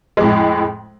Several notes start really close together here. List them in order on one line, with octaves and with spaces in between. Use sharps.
G#3 F2 A2